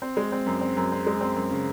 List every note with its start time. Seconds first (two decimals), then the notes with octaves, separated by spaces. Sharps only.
0.02 C4
0.17 G#3
0.32 C4
0.46 F#2
0.61 C4
0.77 F#2
0.92 C4
1.07 G#3
1.21 C4
1.36 F#2
1.51 C#3